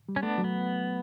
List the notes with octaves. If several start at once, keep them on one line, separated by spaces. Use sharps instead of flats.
G3
C#4
A3 B3 D4
F#3
B3